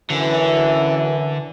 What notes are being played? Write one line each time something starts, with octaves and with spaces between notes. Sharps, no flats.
F#2 D3 E3